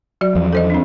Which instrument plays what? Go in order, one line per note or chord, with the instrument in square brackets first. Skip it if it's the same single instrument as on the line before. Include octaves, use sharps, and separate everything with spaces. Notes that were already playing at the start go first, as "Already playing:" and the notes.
[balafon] F#3 F#4 D5
[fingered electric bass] E2 F3
[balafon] A4 C5 D#5
C4 D4